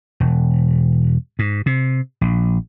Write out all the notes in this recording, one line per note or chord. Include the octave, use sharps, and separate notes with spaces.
E1
G#2
C3
A#1